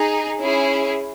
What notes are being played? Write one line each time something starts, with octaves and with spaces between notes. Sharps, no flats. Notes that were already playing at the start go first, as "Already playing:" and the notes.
Already playing: D#4 G#4
C#4 E4 G#4